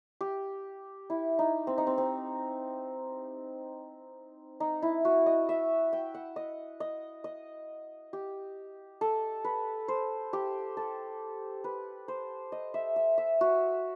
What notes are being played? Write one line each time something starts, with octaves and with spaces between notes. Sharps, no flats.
G4
E4
D#4
C4
D#4
C4
C4
D#4
E4
F#4
D#5
E5
G5
F#5
D#5
D#5
D#5
G4
A4
B4
C5
G4
A4
B4
C5
D#5
E5
E5
E5
F#4